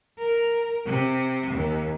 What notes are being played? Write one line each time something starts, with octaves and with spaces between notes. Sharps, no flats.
A#4
C3
D#2